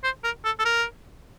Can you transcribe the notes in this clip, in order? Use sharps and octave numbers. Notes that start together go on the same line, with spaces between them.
C5
A#4
A4
A4
A#4